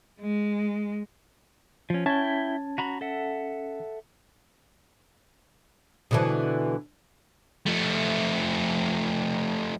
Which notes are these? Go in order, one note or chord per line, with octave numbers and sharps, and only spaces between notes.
G#3
F3 C#4
C#4 E4 G5 A5 G#6
F#4 A#5 B5
A4 E5 F#5
B2 D3 E3
F3 A3